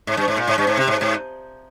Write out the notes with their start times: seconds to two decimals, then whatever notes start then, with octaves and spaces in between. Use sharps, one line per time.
0.07 G#2
0.17 G2
0.28 G#2
0.37 A#2
0.47 G#2
0.58 G2
0.67 G#2
0.77 C3
0.88 G#2
1.01 G#2